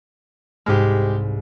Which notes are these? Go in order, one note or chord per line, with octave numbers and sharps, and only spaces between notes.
C2 G#2 G#3 G4 F6